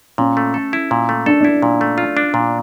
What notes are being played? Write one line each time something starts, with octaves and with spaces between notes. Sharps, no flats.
A#2 C#4
A3
A4
E4
A#2
A3
D4 A4
D4 E4
A#2
A3
F4
D4
A#2